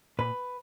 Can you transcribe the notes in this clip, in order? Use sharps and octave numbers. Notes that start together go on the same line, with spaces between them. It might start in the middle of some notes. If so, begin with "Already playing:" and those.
A#2 B4